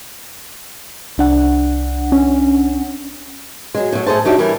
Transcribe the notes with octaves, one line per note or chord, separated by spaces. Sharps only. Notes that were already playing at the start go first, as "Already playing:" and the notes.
C2 D4 F#5
C#4
F#3 G#3
A2 F#3
A3 G#4 A4 C5 A5
F#3 D4 D#4 G4 E5
E3 G3 E4 A#4